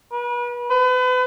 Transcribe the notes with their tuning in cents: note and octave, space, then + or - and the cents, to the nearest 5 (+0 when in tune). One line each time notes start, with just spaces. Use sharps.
B4 -35
B4 +35